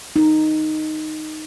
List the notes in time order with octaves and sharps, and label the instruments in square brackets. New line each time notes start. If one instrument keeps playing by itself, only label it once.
[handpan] D#4